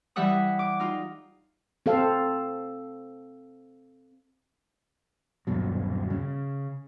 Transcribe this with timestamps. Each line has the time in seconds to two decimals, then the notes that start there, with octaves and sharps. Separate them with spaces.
0.16 E3 G3 E5 F#5 D#6
0.59 D6
0.80 D#4 F4
1.86 C4 A4 F5
5.47 D#1 G2 B2 F#3
6.10 C#3